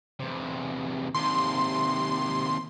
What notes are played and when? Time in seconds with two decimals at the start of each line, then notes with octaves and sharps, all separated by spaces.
0.20 E2 C3
1.15 D#2 C3 C6